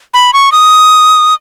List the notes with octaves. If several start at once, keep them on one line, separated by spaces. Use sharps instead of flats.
B5
C#6
D#6